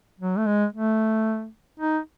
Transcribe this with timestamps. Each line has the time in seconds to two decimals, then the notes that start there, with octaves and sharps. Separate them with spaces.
0.20 F#3
0.38 A3
0.47 G#3
0.73 A3
1.80 D#4